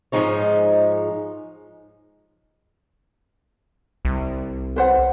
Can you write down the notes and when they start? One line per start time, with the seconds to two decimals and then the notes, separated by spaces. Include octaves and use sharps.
0.12 G#2 C#3 F3 G#3 D#4 C#5
4.05 C2
4.76 B4 C5 F#5